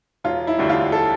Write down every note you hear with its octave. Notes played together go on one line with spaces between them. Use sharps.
E1 F4
E4
D2 D3 G3
F4
A4